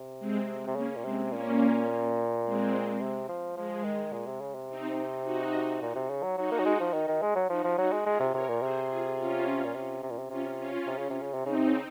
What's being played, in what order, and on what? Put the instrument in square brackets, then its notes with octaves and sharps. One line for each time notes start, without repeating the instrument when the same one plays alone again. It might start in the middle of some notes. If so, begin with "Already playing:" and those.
Already playing: [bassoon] C3
[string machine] G#3 C4
[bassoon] C3
[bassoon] C#3 [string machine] A#3 C#4
[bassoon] A#2
[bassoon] C3 [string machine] G#3 C4
[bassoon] A#2 [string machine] A#3 C#4
[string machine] G#3 C4
[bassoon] C3
F3
[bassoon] F3 [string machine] G#3
[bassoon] D#3
A#2
C3
C#3
C3
[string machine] C4 D#4
D#4 F#4
[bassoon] A#2
C3
C#3
F#3
[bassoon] F#3 [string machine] D#4 F#4
[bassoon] A#3
F#3
G#3
F3
D#3
D#3
G#3
F#3
[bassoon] F3 [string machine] D#4 F#4
[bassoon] F3
[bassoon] F#3 [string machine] D#4 F#4
[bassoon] G#3
[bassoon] G#3 [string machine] F4 G#4
[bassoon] C3
[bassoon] C3 [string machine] A#4 C#5
[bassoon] A#2
[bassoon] C3 [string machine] G#4 C5
[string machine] F4 G#4
C#4 F4
[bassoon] A#2
C3
C3
A#2
C3
[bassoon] C3 [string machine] C#4 F4
[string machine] C#4 F4
[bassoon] C3
C#3
C3
C#3
C3
[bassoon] C#3 [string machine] C4 D#4
[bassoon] C3
C#3